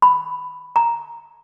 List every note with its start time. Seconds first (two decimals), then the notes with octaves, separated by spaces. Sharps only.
0.02 B5
0.76 A#5